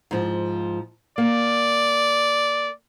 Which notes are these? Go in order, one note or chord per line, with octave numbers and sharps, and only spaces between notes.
G#2 F3
A#3 D5